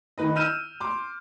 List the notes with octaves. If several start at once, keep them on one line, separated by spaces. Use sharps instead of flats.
D#3 B4 D#5
E6 F6 G6 D#7 E7
C6 D6